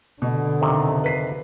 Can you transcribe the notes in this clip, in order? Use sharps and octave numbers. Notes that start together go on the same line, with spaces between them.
B2 D3
F2 C3 D#3
B4 B6 C7